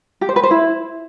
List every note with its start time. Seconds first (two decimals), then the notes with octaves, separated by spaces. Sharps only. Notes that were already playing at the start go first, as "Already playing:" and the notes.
0.21 G4
0.29 C5
0.36 B4
0.43 C5
0.51 E4